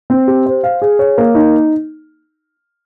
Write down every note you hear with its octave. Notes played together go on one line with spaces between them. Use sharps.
C4
G4
C5
F5
G#4
C#5
A#3
D#4